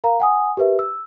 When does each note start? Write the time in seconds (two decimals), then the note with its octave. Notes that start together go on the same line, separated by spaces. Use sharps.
0.04 A#4 F5 A#5
0.20 F#5 G#5 D#6
0.57 G4 A#4 B4 E5
0.79 E6